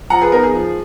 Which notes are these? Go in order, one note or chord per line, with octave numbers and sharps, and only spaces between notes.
F3 F#5 A#5
G#4 B4
B3 D#4 A#4
G#4
F3